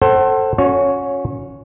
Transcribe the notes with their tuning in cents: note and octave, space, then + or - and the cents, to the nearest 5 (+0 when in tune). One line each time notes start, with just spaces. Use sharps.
A4 +10 C5 +25 F#5 +35
C#4 +0 F#4 -30 C#5 +10